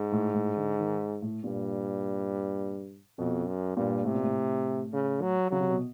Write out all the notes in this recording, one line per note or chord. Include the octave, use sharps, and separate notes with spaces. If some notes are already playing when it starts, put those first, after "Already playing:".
Already playing: G#2
A2
A2
D3
D#3
A2
G2 A#2
F2 B2
F#2
G2 A#2
A2 C3
A#2
A2
C#3
F#3
C#3 F#3
C3
B2